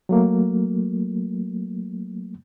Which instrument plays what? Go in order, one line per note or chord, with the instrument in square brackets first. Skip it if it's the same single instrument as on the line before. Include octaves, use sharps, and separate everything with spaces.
[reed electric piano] F#3 A3 A#3